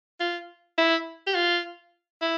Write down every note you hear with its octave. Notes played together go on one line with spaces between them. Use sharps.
F4
E4
G4
F4
E4